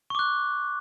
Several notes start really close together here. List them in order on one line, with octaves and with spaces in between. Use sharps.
C#6 D6 F#6